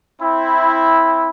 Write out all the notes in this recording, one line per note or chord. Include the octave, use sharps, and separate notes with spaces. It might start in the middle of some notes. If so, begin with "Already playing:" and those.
C4 E4